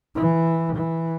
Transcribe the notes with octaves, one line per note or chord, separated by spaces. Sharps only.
E3
E3